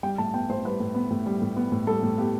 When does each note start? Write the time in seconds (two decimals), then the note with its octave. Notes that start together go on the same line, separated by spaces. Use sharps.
0.03 G3 G5
0.18 A2 A5
0.34 B3 G5
0.49 A2 C5
0.65 G3 B4
0.80 A2
0.95 B3
1.11 A2
1.26 G3
1.42 A2
1.56 B3
1.72 A2
1.87 G3 A4
2.03 A2
2.18 B3 G4